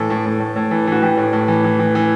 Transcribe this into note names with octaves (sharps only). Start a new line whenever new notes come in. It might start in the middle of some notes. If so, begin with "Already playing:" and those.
Already playing: A2 E3 A4
A2
A2
A2
A2
E3
E3 F#4
E3 G4
A2
A2
E3
E3
E3
E3